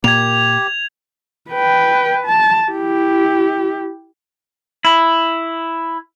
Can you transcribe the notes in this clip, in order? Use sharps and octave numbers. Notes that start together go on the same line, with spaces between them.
A#2 A#3 G4 G#6 F7
B4 G5
A5
E4 G4
E4